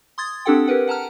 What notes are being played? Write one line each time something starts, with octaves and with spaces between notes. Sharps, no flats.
C6 D#6 G#6 A6
C4 D4 G4 A4 F#5 G5
G4 A#4 B4 F#5
F#5 A5 A#5 F6